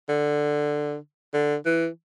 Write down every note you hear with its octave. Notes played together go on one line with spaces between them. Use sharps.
D3
D3
E3